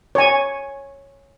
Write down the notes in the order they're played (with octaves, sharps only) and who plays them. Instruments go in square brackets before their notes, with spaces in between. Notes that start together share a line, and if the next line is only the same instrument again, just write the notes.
[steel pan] C#5 G#5